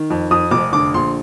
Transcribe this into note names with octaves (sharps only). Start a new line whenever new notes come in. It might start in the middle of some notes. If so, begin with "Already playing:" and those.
Already playing: D#3
F2
F2 D#6
F1 D6
D3 D6
A#1 C6